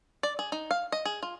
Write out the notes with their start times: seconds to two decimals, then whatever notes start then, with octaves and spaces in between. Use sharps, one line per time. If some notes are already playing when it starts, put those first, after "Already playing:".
0.23 D5
0.39 G#4
0.52 D#4
0.71 F5
0.92 D#5
1.05 G#4
1.23 F4